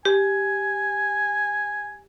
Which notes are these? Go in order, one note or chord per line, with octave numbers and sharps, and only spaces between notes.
G4 G#5